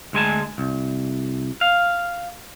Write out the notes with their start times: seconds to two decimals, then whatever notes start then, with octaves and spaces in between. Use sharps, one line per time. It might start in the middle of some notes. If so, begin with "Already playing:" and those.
0.13 D2 G#3 G#5 A5
0.58 C2
1.61 F5